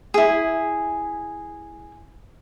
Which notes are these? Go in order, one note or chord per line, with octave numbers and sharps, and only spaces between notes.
E4 G#4